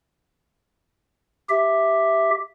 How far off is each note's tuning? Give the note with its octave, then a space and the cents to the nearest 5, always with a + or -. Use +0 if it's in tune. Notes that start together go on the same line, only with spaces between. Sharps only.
G4 +0 E5 +0